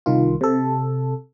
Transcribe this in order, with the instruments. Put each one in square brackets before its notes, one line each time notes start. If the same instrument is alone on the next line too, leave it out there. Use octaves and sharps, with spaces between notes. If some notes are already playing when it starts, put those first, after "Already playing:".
[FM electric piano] C2 D#3 F4
C3 A4